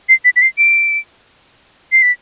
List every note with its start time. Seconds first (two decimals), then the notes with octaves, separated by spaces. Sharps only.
0.09 C7
0.25 B6
0.36 B6
0.42 C7
0.58 D7
1.92 C7
2.02 B6